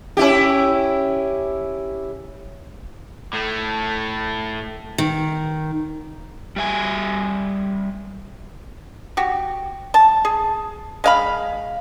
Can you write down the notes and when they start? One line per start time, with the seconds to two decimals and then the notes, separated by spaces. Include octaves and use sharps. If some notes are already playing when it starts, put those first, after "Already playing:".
0.17 C#4 E4 G4
3.33 A2 A3
4.98 D#3
6.56 G3 E5 G#5
9.17 F#4 G4
9.94 A5
10.25 G#4
11.04 G#3 F5 B5